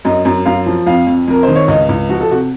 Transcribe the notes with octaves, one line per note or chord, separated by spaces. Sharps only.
F#2 D#5
F#2
F#2 F5
F3
F2 F5
F2
F2 A#4
C5
D#3
C#5
C#2 D#5
C#2
F3 F#4
A4
C3 F#4